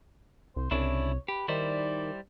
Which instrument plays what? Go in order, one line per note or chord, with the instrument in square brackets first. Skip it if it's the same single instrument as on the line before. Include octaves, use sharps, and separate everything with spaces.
[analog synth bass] C2 [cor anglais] C5
[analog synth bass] C2 [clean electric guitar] C#3 D4 E4 [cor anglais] C#5
[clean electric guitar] G4 [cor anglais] B4
[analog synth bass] D#3 [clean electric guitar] G3 E4 C5 [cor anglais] D5